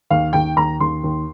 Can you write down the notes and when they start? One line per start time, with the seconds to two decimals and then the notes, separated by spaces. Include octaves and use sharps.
0.10 D#2 F5
0.33 D#2 G5
0.57 D#2 A#5
0.80 D#2 C6
1.04 D#2